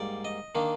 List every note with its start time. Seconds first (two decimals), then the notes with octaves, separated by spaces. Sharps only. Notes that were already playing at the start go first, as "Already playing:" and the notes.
Already playing: G#2 G3 A#3 D5
0.25 D#5
0.55 D#3 A#3 D4